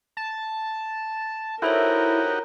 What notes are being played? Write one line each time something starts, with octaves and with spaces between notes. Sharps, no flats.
A5
D#4 E4 F#4 G4 A4 A#4 C5 C#5